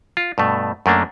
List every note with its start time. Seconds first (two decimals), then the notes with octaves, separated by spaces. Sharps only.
0.17 F4
0.38 G2 B2 A3
0.86 F#2 A3 A#3 D4